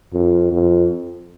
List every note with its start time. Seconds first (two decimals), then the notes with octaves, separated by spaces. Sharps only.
0.13 F2
0.52 F2